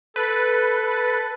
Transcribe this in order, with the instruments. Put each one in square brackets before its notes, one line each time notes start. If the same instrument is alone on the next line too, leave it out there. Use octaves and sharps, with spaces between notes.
[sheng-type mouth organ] A4 [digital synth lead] B4